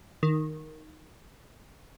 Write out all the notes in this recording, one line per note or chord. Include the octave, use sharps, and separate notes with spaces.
D#3